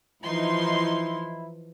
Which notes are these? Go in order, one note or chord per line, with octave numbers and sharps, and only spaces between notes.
E3 F3 D#4 E4 C6